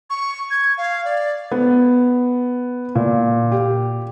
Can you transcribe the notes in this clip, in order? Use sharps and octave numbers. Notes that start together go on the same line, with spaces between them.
C#6
G#6
F5
D5
B3
A#2
G4